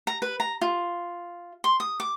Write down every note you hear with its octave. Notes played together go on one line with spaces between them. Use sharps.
A#5
B4
A#5
F4
C6
D#6
D6